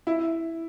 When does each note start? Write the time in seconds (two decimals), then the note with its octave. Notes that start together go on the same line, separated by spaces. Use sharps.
0.07 E4